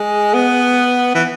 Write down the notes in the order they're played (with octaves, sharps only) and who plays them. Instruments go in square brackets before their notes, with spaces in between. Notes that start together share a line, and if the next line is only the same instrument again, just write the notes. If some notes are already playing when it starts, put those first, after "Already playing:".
Already playing: [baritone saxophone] G#3
B3
E3